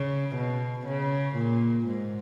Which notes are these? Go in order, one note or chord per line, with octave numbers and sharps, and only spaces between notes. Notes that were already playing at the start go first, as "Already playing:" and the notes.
Already playing: C#3
B2
C#3
A#2
G#2